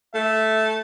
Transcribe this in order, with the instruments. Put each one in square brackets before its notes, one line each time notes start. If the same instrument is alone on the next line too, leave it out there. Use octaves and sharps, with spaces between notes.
[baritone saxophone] A3 [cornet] E5